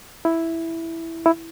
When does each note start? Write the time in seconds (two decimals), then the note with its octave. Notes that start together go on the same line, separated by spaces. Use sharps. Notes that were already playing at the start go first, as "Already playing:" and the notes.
0.25 E4
1.26 E4